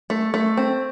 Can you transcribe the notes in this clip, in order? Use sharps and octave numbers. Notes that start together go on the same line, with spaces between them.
A3
A3
C4